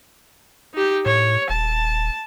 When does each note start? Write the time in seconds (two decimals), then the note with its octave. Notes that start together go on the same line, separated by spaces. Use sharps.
0.74 D#4 G4
1.06 A2 C#5
1.50 D#1 A5